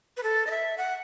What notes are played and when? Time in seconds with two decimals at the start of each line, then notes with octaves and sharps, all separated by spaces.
0.17 B4
0.23 A4
0.47 D#5
0.51 E5
0.78 F#5